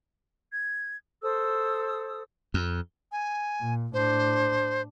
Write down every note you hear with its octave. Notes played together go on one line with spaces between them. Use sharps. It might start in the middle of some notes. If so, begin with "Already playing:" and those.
G#6
A4 C5 D#6 E6
F2
G#5
A#2
A2 D4 C5